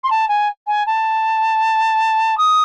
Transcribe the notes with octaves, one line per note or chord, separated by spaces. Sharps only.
C6
A5
G#5
G#5
A5
D#6